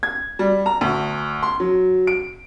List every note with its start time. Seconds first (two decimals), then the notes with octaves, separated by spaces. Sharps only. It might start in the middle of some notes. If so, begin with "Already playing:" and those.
0.03 G#6
0.39 G3
0.66 A#5
0.81 D2
1.43 C6
1.60 F#3
2.07 D7